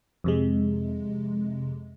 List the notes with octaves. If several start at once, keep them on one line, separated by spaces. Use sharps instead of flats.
F2 C3 G#3